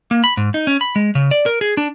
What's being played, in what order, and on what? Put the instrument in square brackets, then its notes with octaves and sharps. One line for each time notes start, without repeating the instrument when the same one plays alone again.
[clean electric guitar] A#3
B5
G#2
D#4
C#4
B5
G#3
C#3
D5
A#4
G#4
D4